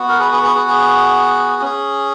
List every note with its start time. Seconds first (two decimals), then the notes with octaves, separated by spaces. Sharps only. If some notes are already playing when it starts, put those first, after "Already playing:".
Already playing: B3 F#4
0.08 A#4
0.19 G#4 B4
0.32 G#4 B4
0.43 G#4 B4
0.55 G#4
0.67 G#4
1.61 C#4 G#4